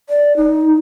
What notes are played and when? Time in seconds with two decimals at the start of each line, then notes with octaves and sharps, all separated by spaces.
0.10 D5
0.37 D#4